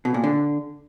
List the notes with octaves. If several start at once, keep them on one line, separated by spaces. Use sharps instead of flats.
B2
A#2
D3